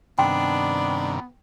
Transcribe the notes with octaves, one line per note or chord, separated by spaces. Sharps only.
G2 C3 D#3 B3 D4 G5